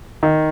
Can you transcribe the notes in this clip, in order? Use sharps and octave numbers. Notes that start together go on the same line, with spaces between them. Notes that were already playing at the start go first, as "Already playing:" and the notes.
D#3 D#4